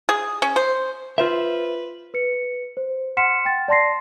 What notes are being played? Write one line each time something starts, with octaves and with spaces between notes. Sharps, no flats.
G#4
C#4
C5
F4 B4 C5 E5
B4 C#7
C5
F#5 C6 F6 B6 C#7 E7
G5 A6
D5 A5 C6 A#6 C7